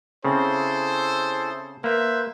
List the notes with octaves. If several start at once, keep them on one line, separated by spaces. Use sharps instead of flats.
C#3 C4 E4 G#4 A4 C5
A#3 B4 C5 E5